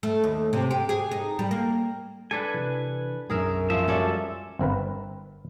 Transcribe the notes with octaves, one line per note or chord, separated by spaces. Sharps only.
A3
D#2
C3
G4
G#4
D#4
G3
A#3
D4 A4 B4 G#5
C3 E3
B1 F#2 G#4 A#4 E5
F3 E5
G3 G#3 C#4 F#4 A4 D5
G1 C4 A#4 B4